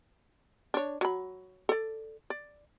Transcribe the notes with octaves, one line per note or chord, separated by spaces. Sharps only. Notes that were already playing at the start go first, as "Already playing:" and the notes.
D4 C#5
F#3 B5
A4 D5
D5